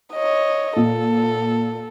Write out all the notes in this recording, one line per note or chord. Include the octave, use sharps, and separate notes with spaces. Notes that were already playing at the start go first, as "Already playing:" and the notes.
C#5 D#5
A#2 A4